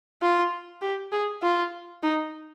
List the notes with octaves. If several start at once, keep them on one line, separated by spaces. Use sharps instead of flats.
F4
G4
G#4
F4
D#4